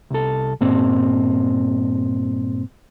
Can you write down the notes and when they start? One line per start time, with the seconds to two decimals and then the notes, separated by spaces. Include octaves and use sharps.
0.11 C2 A4
0.61 G2 A#2 C4